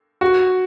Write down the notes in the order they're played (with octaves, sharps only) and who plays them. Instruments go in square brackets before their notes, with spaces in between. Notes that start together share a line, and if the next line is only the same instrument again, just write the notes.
[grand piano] F#4